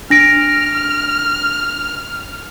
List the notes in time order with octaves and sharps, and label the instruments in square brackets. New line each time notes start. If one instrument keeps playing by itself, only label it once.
[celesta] D4 A#6 D7 [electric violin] F6